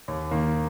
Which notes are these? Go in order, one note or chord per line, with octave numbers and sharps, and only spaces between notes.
D#2
D#3 A#3